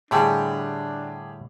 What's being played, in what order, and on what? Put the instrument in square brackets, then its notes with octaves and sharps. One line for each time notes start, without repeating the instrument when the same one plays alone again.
[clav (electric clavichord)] A2 D3 G3 [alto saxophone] D4 [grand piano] G4 G#4